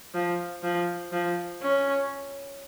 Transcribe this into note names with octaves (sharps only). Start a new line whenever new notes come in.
F3
F3
F3
C#4